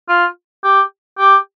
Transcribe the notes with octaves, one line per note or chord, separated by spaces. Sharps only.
F4
G4
G4